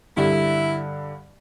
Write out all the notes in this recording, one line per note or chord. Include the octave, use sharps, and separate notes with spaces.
G2 D3 G3 E4